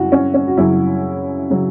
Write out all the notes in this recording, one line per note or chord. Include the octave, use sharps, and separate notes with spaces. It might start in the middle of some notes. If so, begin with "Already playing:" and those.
Already playing: F#2 C#3 F#3 E4 F#4
C#4
C#4
F#4
F#2 C#3 F#3 E4
C#3 F#3